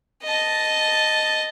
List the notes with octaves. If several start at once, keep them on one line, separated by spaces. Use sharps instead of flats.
D#5 A5